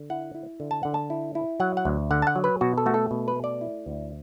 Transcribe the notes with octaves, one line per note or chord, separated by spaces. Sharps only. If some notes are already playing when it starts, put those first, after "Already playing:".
Already playing: D3
E4 F#5
E4
D3
A5
D3 F#5
A5
E4
E4
F#3 F#5
F#5
D2
D3 F#5
A5
F#5
F#3
B4
B2 F#4
A4
A3 F#4
A4
B2
B4
A3
D5
E4
D2